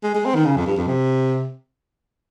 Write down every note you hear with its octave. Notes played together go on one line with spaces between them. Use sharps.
G#3
G#3
C4
D#3
C#3
F2
G2
F2
C3